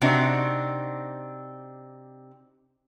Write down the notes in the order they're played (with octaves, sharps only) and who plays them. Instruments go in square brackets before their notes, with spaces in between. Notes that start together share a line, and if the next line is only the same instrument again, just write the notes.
[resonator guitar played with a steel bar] C3 C4 D4 D#4 F#4